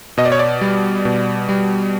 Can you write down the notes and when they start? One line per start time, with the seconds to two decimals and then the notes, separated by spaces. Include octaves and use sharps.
0.18 B2 D#5
0.25 D5
0.32 C#5
0.39 D5
0.61 G3
1.05 B2
1.49 G3